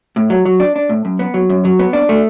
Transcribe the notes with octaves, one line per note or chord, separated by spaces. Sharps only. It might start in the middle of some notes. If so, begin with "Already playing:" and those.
A2
F#3
F#3
D4
D4
A2
F#2
B3
F#3
F#2
F#3
B3
D4
A3